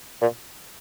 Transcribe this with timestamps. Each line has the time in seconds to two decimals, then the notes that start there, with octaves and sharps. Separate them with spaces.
0.21 A#2